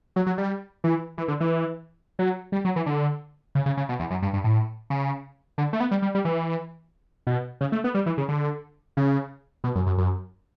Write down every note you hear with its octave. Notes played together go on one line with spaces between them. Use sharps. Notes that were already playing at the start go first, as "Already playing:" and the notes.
F#3
F#3
G3
E3
E3
D3
E3
F#3
G3
F#3
E3
D3
C#3
C#3
C#3
B2
E2
F#2
G2
G2
A2
C#3
D3
A3
B3
G3
G3
G3
E3
B2
C#3
A3
B3
G3
E3
C#3
D3
C#3
B2
F#2
F#2
F#2